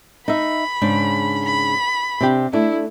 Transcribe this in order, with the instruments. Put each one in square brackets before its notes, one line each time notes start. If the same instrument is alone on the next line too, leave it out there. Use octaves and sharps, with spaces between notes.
[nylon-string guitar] D#4 E5 [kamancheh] B5
[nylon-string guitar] G#2 C#3 D4
[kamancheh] B5
[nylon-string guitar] C3 D4 G4
[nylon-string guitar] A3 D4 [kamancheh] E4